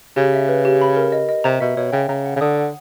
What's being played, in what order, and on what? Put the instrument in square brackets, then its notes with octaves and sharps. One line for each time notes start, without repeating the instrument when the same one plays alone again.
[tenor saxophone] C#3 [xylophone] G4
[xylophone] E5
B4
G4
B5
A#4
D#5
D#5
[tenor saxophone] C3 [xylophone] A#5
[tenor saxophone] B2 [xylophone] E5
[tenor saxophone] B2 [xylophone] C#5
[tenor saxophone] C#3 [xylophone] G5
[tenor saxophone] C#3 [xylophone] A#5
[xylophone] F#5
[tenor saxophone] C#3
[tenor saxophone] D3 [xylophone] D#6
[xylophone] F#5